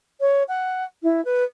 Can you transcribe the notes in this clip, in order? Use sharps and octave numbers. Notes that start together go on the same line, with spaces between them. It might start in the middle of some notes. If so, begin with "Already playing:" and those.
C#5
F#5
E4
B4